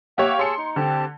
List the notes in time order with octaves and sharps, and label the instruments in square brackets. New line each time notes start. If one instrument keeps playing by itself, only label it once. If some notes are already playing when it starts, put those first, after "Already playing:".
[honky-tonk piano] A#3 G4 C#5 [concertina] E5 F#5
[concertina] G#4 A5 E6 [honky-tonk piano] C6 C#7
[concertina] D#4
[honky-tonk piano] D3 [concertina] C4 G4 A5